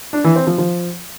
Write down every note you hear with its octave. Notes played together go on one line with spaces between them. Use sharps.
D4
E3
C4
F3
F3